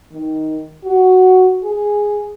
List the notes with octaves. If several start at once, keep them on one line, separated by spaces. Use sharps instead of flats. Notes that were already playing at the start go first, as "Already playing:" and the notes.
D#3
F#4
G#4